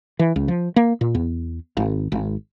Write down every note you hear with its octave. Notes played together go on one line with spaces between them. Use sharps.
E3
C#2
F3
A#3
A#2
E2
G#1
G#1